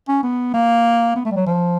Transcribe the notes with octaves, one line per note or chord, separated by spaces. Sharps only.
C#4
B3
A#3
B3
A3
G3
F#3
F3